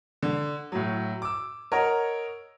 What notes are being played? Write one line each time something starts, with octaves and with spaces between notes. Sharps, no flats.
D3
A2 F#3
D6 E6
A#4 C#5 D#5 F#5